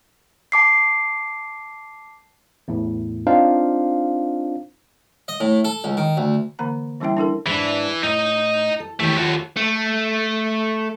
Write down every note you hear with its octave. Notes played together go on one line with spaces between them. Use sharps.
A5 D6 C7
E2 A2
C4 D4 D#4 F4 C5 F5
D#5
A2
A4
C#2
D#3
D2
D3 E3 A#3 A#5
E3 G3 C#4 E4 E5 G5
D4 E4 A4 A#4
G#2 E3 D4
A2 D#4 D#5
A4
D#2 E3 A3 G4
D#2 F4 F#4 A4 C#5
A3